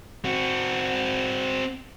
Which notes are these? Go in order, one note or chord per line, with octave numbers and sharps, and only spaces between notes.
C4 F#4